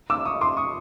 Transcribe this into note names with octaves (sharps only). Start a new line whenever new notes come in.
D6 E6
C#6 D#6
C6 D6
C#6 D#6